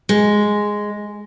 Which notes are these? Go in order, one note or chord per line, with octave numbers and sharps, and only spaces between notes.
G#3